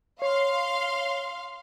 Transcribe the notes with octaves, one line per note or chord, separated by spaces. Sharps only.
C#5 F5 C6